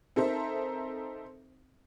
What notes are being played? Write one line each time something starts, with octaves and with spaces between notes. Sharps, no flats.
C4 D#4 A4 A#4 C5 E5